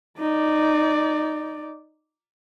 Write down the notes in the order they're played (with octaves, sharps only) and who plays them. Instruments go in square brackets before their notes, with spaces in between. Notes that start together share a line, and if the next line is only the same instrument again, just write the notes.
[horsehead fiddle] D#4 D5